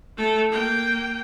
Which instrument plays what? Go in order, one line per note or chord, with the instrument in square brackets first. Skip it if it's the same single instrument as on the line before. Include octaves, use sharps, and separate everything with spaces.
[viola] A3 A4
A#3 G5